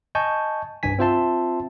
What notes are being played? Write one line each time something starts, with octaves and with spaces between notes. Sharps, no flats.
D#5 G#5 A5 C#6 G6
C2 G2 G#5 B6
C4 F4 C5 E5 A5 C6